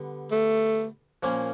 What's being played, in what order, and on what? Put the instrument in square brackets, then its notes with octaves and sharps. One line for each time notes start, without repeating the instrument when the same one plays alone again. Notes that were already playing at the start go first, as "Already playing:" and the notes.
Already playing: [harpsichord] D3 G3 B3
[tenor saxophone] A3
[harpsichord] A#2 F3 A#3 C#4